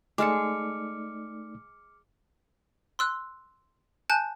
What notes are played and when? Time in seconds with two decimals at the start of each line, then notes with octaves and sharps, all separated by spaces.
0.18 G#3 A3 D#4 D5 A5 D6 F6 C#7
2.99 C6 E6 F#6
4.10 G#5 A5 F#6 G6